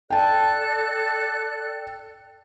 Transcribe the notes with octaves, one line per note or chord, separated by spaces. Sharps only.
A4 D5 G5 A5 F#6